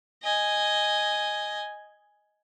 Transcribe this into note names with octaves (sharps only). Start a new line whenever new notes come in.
D#5 G#5